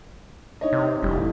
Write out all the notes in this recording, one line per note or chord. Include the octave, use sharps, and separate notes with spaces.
D#4 C#5 D#5
C3
F1 E3 G3 D#4
A2 E3